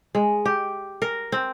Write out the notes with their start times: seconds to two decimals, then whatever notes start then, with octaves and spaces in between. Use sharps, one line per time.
0.15 G#3
0.45 G4
1.02 A#4
1.32 C4